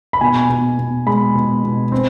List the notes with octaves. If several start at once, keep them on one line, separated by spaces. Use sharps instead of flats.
B5
B2 G#5
B2
B2
G#3 B5
B2
B2
C4